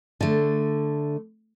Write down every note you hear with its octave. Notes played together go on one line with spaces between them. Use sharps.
D3 A3